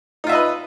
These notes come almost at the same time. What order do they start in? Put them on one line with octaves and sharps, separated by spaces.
D#4 F4 E5 D#5 B4